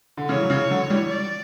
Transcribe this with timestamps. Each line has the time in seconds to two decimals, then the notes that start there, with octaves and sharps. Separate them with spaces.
0.17 D3
0.29 C#3 E3 C#5
0.42 F#3
0.50 C#3 E3
0.70 D3 F#3
0.90 E3 G3
1.11 D5